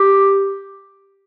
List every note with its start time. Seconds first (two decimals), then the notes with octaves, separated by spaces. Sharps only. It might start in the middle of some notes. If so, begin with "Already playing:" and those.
Already playing: G4